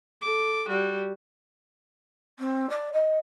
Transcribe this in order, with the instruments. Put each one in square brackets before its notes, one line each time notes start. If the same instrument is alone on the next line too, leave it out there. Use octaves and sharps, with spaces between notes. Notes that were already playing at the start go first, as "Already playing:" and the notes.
[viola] A4 D6
G3 F#4
[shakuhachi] C4
D5
D#5